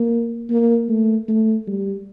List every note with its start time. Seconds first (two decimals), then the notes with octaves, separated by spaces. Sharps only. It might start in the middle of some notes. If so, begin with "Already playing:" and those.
Already playing: A#3
0.50 A#3
0.89 A3
1.28 A3
1.68 G3